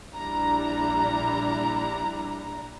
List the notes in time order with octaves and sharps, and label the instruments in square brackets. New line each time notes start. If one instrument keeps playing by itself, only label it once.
[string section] A#1 G3 D4 E4 A#5